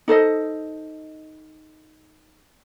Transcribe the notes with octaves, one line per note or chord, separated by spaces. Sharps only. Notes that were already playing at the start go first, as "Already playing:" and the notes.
D#4 A4 C5 D#5